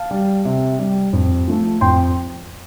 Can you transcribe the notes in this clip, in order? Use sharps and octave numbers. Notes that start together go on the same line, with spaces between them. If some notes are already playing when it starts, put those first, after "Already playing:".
Already playing: F5 A5
G3
C3
G3
F2
F3 A3
F2 G5 C6